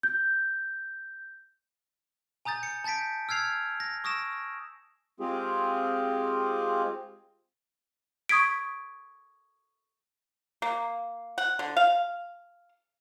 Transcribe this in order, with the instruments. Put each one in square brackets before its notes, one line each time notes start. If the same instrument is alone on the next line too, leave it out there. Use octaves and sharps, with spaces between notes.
[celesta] G6
[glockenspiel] G#5 A#5 D#6 G6 A6
C#7
A5 G6 A6 B6 D7
E6 F6 G#6 C7 F7
A#6
C#6 D#6 E6 A#6 D7 E7
[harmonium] G#3 C4 F4 G4 G#4
[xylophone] C#6 D#6 G#6 B6 D7
[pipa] A#3
F#5
D3
F5